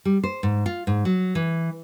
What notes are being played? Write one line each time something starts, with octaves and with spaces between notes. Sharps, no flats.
G3
C5
G#2
F4
G#2
F#3
E3